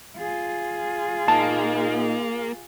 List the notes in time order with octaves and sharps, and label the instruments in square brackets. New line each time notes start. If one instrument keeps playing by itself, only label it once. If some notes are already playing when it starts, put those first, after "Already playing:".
[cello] F4 G#4
[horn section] A#2 D#4 [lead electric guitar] A#3 [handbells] A5